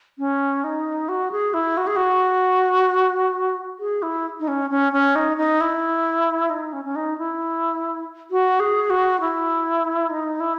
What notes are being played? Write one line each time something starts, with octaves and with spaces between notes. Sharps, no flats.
C#4
D#4
F#4
G#4
E4
F#4
G#4
F#4
G#4
E4
D#4
C#4
C#4
C#4
D#4
D#4
E4
D#4
C#4
C#4
D#4
E4
F#4
G#4
F#4
E4
D#4
E4